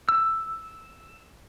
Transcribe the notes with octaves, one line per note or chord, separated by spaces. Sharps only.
E6